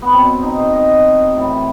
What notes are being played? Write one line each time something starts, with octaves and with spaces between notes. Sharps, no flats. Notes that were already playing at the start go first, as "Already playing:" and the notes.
B3
B2 F#3 C4
D#4
C5
D#5
A2 E3